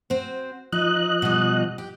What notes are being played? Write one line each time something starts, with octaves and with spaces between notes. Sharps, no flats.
C4 F#4 C5
F3 D#4 D#5 F#6
B2 G3
G4